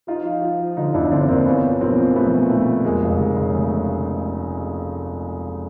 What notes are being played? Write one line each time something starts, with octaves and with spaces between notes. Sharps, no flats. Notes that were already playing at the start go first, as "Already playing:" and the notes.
F3 D#4 F4
F3
F3
F3
D3 D#4 F4
G1 D4 E4
D3 C4 D4
G1 A#3 C4
F3 B3 C#4
F3
B1 A#3 C4
F3
B1 A3 B3
A#2
B1 A3
F3
F1 G#3 A#3
F1
C#3
C#3
C#3 A3